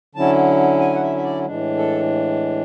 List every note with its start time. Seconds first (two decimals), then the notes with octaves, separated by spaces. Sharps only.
0.15 D3 F#3 C#4 E4 A5
0.80 G#5
0.94 F#5
1.03 E5
1.16 E5
1.23 D5
1.45 A2 E3 G#3 D4
1.78 A4